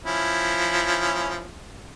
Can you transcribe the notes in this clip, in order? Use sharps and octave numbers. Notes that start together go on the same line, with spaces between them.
F3 C#4 E4